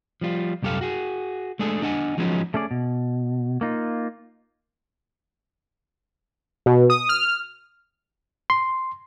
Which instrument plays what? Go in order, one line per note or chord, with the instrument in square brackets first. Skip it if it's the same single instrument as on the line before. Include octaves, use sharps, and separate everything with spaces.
[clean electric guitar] F3 G3 F4
C2 F#2 G4 A4 F5
F#4 G#4
G#3 A3 D4 G#4 A4
D4 D#5 F#5 G#5
F3 F#3 G#3 B3 C#4 D#4
[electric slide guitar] A3 C#4 G#4 D5
B2
A#3 D#4 F4
[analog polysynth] B2
D#6
F6
[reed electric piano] C6